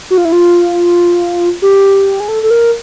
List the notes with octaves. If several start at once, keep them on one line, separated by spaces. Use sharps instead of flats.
F#4
F4
E4
F4
G4
G#4
A4
A4
A#4